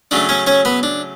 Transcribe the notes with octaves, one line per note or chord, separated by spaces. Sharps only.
C#3 F#3 A3 D4 D5
C#4 C#5
C#4 C#5
B3 B4
D4